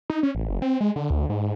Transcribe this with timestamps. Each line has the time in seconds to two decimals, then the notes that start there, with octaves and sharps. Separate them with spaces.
0.10 D#4
0.23 C#4
0.35 A1
0.49 F#1
0.62 C4
0.81 G#3
0.96 D3
1.10 D2
1.30 G#2